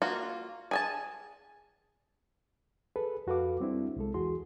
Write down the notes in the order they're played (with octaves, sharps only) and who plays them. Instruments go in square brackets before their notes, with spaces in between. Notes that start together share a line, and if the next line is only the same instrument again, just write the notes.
[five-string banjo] A#3 F4 F#4
G#4 G#5 A5
[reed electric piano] G#4 A4 B4
F2 F#4 A4 B4 F5 D6
G3 C4 D4 E4
C2 G#3 A4
E2 E3 F#4 G#4 C6